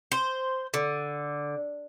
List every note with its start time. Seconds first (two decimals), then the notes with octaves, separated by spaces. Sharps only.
0.12 C5
0.74 D3